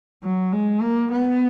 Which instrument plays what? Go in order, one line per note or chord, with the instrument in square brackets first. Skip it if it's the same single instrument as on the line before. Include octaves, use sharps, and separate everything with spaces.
[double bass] F#3
G#3
A#3
B3